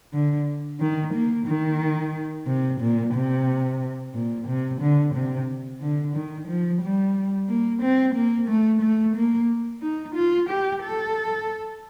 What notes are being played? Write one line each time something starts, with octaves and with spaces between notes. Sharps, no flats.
D3
D#3
A#3
D#3
C3
A#2
C3
A#2
C3
D3
C3
D3
D#3
F3
G3
A#3
C4
A#3
A3
A3
A#3
D#4
F4
G4
A4